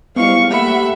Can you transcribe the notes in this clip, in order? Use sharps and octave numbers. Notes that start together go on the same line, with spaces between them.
G3 G#3 B3 E4 C5 F5 C#6
A3 A#3 G4 E5 F#5 B5